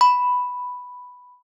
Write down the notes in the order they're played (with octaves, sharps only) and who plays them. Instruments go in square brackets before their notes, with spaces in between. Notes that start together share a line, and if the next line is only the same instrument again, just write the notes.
[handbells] B5